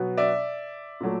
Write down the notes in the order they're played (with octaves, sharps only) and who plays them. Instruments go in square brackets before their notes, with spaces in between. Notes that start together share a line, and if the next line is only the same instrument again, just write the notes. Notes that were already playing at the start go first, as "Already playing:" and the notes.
Already playing: [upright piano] B2 F#3 B3
D5 E5
A#2 F#3 A3